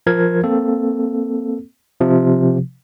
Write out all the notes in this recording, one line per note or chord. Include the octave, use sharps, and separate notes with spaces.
F3 A#4 G#6
A#3 C4 A4
C3 F3